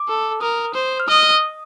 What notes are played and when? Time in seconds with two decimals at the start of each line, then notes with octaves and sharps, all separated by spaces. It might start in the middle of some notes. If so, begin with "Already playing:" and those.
Already playing: D6
0.09 A4
0.41 A#4 D#6
0.74 C5
1.00 F6
1.08 D#5 D#6